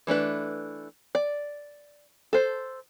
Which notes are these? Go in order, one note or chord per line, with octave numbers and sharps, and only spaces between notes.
E3 A3 D4 B4
D5
A4 C5